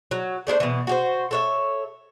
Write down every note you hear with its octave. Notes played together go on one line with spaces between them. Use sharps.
F#3
A3 D4 G#4 C5
B2 E3
F#4 G4 C5
A4 C#5 E5